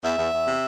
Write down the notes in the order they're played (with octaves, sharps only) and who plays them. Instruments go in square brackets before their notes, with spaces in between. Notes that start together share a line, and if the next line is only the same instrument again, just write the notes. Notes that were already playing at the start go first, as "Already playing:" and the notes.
[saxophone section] E2 E5
E2
E2
C3